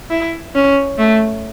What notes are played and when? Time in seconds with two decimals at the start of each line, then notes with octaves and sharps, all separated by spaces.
0.10 E4
0.55 C#4
0.98 A3